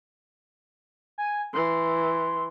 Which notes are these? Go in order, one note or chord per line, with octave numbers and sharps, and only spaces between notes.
G#5
E3 C6